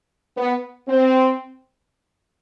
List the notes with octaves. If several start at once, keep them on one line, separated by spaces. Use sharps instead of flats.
B3
C4